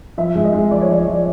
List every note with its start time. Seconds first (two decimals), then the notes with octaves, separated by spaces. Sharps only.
0.18 F3 E5
0.35 G#3
0.44 D#5
0.53 G#3
0.71 F3 D5
0.81 C#5
0.89 F3 D5
1.07 F3